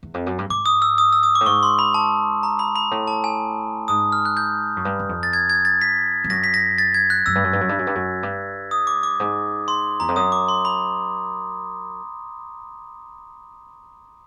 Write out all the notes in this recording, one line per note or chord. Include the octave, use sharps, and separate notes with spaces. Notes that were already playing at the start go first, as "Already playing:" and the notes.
E2
F2
F#2
G2
G#2 D6
D#6
E6
D#6
E6
D#6
D6
A2
G#2 C#6
C6
B5
A5
A#5
B5
B5
A2
A5
G#5
G#2 D#6
F6
F#6
G6
F#2
G2
F#2
F2
A6
G#6
G#6
A6
B6
G2
F#2 A#6
B6
A#6
A6
G#6
F#6
F#2 E6
G2
F#2
G2
F#2
G2
F#2
G2
F#2
G2
D#6
D6
D6
G#2
C6
E2 A#5
F2
F#2 D#6
D6
C6
B5